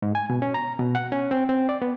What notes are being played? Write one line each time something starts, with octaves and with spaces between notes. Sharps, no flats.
G#2
G#5
B2
C#4
A#5
B2
F#5
C#4
C4
C4
D5
B3